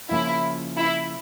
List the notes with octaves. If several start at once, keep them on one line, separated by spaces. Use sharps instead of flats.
C#3 F3 A#3 C#4 E4 F4
E4